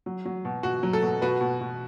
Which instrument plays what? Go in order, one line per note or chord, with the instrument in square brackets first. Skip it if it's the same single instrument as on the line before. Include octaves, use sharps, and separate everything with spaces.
[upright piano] F#3
F#3
B2
B2 F#4
F#3
A4
B2
B2 F#4 B4
B2
B2